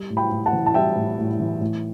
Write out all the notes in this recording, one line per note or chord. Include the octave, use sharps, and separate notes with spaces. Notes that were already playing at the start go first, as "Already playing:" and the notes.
Already playing: G3
A2
G5 B5
A2
F#5 A5
E3
A5
G3 E5 G5
A2
A2
E3
A2